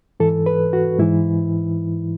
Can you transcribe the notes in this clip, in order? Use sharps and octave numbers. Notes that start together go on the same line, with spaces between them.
G#2 E3 A4
B4
F#4
G#2 E3 E4